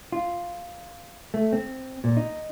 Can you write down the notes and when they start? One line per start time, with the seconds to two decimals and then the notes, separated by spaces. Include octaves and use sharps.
0.12 F4
1.34 A3
1.53 C4
2.04 A#2
2.17 D#4